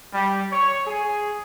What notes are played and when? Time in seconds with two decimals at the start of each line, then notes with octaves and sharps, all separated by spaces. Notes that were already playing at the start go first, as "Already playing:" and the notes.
0.13 G3
0.51 C#5
0.87 G#4